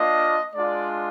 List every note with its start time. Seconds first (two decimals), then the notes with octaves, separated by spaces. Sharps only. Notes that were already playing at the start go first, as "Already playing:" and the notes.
Already playing: A#3 D4 F4 D#5
0.53 G#3 D4 F4 D5